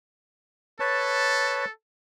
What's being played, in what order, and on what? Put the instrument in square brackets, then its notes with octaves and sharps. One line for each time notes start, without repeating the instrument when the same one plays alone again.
[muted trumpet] A4 [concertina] B4 C#5 A5